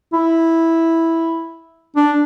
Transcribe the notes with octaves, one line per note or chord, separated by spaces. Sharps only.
E4
D4